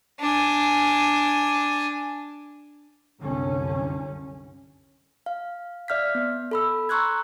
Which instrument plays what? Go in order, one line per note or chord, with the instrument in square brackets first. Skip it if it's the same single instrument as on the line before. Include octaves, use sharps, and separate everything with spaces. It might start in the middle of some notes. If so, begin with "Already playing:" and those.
[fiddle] D4 G#5
[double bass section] C2 F#2 D3 C#4
[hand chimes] F5
D5 E5 F6 G6 B6
B3
A4 B5 E6
A#5 C6 C#6 E6 F#6 G#6